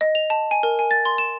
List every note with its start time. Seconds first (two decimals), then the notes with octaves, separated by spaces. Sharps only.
0.01 D#5
0.15 F7
0.30 A5
0.51 G#5
0.63 A#4
0.79 G#5
0.91 A6
1.05 C6
1.18 E7